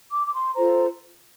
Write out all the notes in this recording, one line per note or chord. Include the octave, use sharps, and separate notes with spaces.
D6
D6
C6
F4 A4 C5 A#5